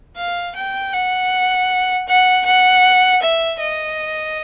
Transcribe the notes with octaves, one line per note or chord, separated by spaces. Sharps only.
F5
G5
F#5
F#5
F#5
E5
D#5